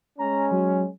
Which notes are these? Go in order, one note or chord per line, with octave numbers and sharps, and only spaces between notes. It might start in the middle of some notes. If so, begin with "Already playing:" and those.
G#3 C#4 A#5
F#3